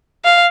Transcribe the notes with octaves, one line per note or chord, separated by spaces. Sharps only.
F5